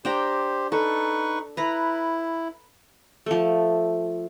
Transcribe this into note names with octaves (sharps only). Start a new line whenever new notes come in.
D4 G4 C5 G5 A#5
D#4 A4 B4 C#6
E4 B4 A#5
F3 A3